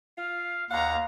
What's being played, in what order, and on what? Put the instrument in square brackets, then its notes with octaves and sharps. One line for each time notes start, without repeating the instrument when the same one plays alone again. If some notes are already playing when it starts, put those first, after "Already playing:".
[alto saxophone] F4 [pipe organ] F5
[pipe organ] D#2 [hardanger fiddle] F5 A#5 [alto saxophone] F#5